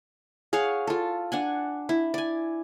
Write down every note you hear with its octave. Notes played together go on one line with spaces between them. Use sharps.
G#4 C#5 F5 F#5
F4 A4
D4 F#5 G#5
E4
D5 G#5